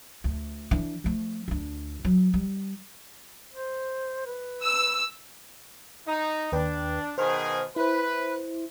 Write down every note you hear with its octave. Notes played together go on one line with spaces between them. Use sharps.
D2
E3 D4
F3 A3
D2 D4
F#3
G3
C5
B4
E6
D#4
D#2 D4 B4 G5
B2 D#3 G#4 C5 F6
E4 B4 C5